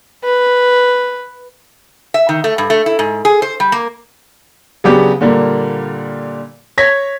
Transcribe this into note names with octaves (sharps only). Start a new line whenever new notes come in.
B4
E5
D#3
A3
G2
A3
E4
G#2
G#4
C5
G3
A#3
C#3 F#3 B3 D4 G4
A#2 D3 G3 A#3
C#5 G#6 A#6 B6